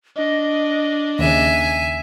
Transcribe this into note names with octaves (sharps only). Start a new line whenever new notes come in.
D4 D#5
D#2 C#3 E5 G#5